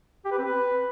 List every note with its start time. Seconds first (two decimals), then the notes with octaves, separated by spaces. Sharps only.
0.25 G4
0.31 B4
0.38 C4
0.45 B4